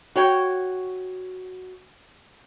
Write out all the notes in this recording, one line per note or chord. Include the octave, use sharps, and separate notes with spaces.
F#4 C#5 G5